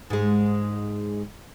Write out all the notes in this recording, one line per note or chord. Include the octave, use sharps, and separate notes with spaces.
G#2 G#3